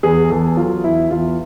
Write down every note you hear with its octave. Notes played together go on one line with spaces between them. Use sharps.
E2 G#4
E2 A4
F#3 F4
E2 E4
E2 F4